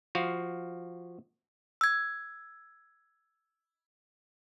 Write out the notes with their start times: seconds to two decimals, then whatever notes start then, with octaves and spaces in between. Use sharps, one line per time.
0.15 F3 F#4 F5
1.81 E6 G#6